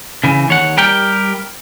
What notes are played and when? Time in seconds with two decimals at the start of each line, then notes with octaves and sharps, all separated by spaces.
0.24 C#3 E3
0.48 D#2 C#5 F#5
0.77 G3 G4 A#4 G5